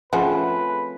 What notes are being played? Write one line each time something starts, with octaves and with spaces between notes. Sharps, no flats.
F3 A3 C4 C#4 G#4 B4 F#5